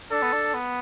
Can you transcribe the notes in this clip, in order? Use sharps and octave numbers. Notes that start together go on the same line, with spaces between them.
D4 A4
B3
D4
B3